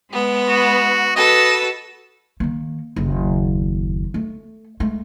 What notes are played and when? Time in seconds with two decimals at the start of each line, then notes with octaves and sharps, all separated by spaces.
0.11 G#3 B3
0.48 F#4
1.16 F#4 A4 B4 D#5
2.40 D#3 A#3
2.96 F#1 D#2
4.14 A3
4.80 G#3 A3